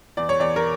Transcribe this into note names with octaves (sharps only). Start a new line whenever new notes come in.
E2 D5
C#5
E2 D5
A#4